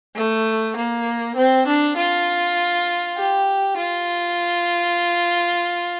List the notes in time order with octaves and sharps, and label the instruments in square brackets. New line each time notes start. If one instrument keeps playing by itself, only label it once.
[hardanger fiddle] A3
A#3
C4
D4
F4
G4
F4